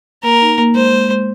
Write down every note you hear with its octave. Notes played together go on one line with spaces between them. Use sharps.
A#3 A#4
D#4
A#3
G#3 C5
G#3
G#3